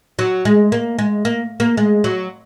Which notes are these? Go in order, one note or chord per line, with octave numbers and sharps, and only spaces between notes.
F#3
G#3
A#3
G#3
A#3
A#3
G#3
F#3